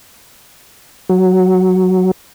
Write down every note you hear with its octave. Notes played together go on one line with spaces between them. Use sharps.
F#3